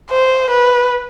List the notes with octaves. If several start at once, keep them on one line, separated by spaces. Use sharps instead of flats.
C5
B4